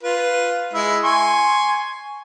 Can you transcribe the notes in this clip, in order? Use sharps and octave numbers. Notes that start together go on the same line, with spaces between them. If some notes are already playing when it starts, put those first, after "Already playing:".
F4 B4
G#3 E4
G#5 C6 C#6